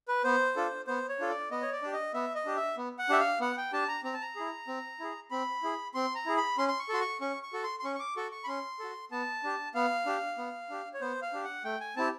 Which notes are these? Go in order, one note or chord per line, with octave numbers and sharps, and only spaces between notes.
B4
B3 C5
D4 F4 A4
B3 C5
C#5
D4 F4 A4
D5
B3 D#5
C#5
D5
D4 G4
D#5
B3 E5
D#5
D4 G4
E5
B3
F#5
D4 G4 E5
F5
B3 F#5
G5
D4 G4 A5
A#5
C4 A#5
A5
A#5
E4 G#4
C4
E4 G#4
C4 B5
E4 G#4
C4 C6
A#5
E4 G#4
B5
C#4 C6
C6
C#6
F#4 A4 C6
C#6
C#4 C#6
C#6
F#4 A4
C6
C6
C#4 C#6
C#6
D6
F#4 A4 C#6
C#6
B5
C#4 C6
F#4 A4
B3 A5
D4 G4
B3 F5
D4 G4
B3
D4 G4
C#5
B3 C5
F5
D4 G4
F#5
A3 G5
G#5
C4 E4 G4 A5